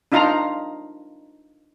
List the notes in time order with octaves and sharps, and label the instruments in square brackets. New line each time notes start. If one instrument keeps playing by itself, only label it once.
[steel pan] D4 D#4 F4 F5 A#5